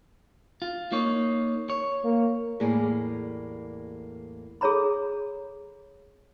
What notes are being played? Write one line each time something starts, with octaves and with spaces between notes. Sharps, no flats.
F4
A#3 D#4 C#5
C#5
A#3
E2 A2 G3 A#3 G#4 D5
G#4 A4 C#5 A#5 B5